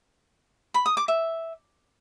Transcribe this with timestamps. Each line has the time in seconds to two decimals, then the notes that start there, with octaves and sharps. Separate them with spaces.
0.74 B5
0.86 D#6
0.97 D6
1.08 E5